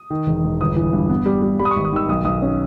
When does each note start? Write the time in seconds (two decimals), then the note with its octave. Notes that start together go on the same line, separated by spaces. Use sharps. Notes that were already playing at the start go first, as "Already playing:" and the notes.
Already playing: D#6
0.10 D#3
0.27 E1
0.44 E1
0.61 G1 D#6
0.76 E3
0.93 G2
1.10 B3
1.26 G3
1.42 G3
1.59 G3 B5
1.65 D#6
1.71 C#6
1.76 G#1
1.85 D#6
1.93 D#3 E6
2.08 B1 D#6
2.25 B1 D#6
2.42 C#4